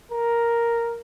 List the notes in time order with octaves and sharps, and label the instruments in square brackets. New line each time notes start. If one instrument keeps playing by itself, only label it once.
[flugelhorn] A#4